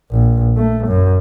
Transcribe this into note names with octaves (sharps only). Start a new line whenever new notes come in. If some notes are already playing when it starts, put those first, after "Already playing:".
A#1
A3
F#2